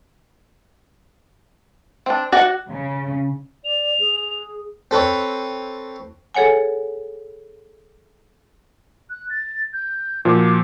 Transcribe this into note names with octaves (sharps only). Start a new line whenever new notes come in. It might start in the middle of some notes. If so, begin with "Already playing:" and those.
C4 D4
F#4 D5 F#5
C#3
D5 F7
G#4
C4 A4 B4 C#5
G#4 A4 C#5 F#5 G#5
F#6
A6
G6
A#2 F3 F#4 D6